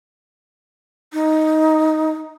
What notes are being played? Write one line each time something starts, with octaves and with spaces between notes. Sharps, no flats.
D#4